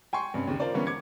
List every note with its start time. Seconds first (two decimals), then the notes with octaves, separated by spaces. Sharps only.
0.13 G5 G#5 C6 C#6
0.34 G2 C3 C#4
0.47 D#2 C#3
0.60 F4 A#4 C5 D5
0.74 D3 E3 G3 A#3 B3 C#4
0.86 D6 G#6 C#7